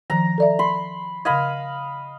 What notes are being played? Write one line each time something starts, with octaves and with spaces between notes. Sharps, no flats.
D#3 F3 A#5
A4 D5 E5
B5 C6
C#3 D#5 F5 B5 G#6